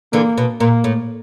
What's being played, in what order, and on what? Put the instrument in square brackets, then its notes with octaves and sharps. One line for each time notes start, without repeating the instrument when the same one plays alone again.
[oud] D3 E3 [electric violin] A#3
[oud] B2
[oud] A#2 [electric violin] A#3
[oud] A2